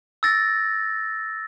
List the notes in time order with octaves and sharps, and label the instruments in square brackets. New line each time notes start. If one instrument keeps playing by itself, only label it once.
[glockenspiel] E6 A6 A#6